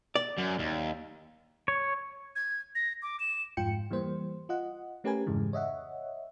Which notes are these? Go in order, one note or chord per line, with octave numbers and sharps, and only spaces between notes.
D5
F#2
D#2
C#5
G#6
A#6
D6
E7
F2 G#2 F4 G5 C#7
E3 G3 A#3 C5
F4 D#5 F#5
A3 C#4 G4 A#4 B4 G#5
F2 G#2 C#3 E3 G#3
C#5 D#5 E5 F#5